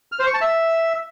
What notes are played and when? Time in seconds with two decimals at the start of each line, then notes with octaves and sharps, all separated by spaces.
0.12 F6
0.19 C5
0.27 C#6
0.34 A5
0.41 E5